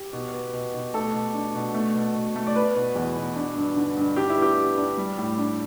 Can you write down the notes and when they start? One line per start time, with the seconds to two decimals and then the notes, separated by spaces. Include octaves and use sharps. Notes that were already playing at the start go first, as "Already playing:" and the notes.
Already playing: G4
0.13 B2
0.33 B3
0.53 B2
0.74 B2
0.94 A3 A4
1.14 B2
1.34 D4
1.55 B2
1.74 A3
1.94 B2
2.15 B2
2.36 A3
2.47 D5
2.55 B3 B4
2.76 B2
2.96 E2
3.16 B2
3.36 D4
3.56 G2
3.76 D3
3.97 G2
4.16 D4 G4
4.29 E4
4.37 B3
4.42 G4
4.57 B3
4.77 D4
4.98 G3
5.18 A2
5.38 D4